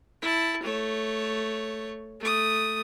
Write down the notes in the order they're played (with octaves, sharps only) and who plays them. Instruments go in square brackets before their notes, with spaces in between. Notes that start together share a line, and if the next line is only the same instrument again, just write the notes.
[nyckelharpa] E4 A5
A3 C#5
A3 D#6